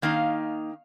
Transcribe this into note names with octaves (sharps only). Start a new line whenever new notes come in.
D#3 A#3 D#4 F5